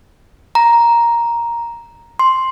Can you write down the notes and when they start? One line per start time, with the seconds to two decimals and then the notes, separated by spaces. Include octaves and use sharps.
0.55 A#5
2.19 C6